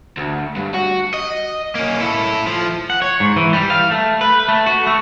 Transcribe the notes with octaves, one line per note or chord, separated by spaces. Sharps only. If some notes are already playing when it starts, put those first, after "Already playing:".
D2
G2
F#4
D#5
A#3 C#4
E4 A4
F3
F#5
C#5
G#2
E3
G3
F5
A3
B4
A3
F#4
A3